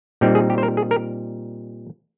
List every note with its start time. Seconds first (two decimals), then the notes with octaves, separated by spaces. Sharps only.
0.21 A#2 G3 C4 D#4 G4
0.35 G#4
0.50 G4
0.58 C5
0.63 A#4
0.77 G#4
0.91 A#4